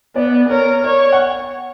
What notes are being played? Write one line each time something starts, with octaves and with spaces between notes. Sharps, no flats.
B3 D5
A#4 C#5
C#5 D5
F#5